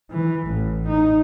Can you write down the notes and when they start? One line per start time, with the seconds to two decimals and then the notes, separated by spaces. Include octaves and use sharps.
0.11 E3
0.48 A1
0.89 D#4